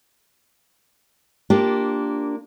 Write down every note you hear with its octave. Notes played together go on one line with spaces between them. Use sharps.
A#3 D4 F4 G4